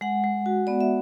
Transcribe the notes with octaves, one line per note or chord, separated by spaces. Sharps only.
G#3 F#5
G#3
F#4
B3 D5
E5